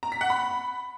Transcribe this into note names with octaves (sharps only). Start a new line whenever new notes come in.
A#5
B6
F#5
B5